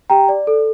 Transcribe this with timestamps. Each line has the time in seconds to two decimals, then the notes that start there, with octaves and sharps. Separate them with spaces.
0.10 G4 G5 A#5
0.29 D5
0.47 A4